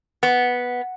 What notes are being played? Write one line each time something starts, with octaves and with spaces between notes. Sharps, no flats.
B3